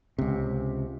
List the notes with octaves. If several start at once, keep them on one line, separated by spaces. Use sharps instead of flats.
C#2 C3